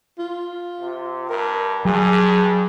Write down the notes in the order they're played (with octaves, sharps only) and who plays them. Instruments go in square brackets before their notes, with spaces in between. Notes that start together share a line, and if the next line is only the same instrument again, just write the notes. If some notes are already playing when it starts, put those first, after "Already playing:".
[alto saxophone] F4
[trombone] C3
[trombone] G2 [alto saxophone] A#4
[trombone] G2 [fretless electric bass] F#3 [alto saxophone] G#4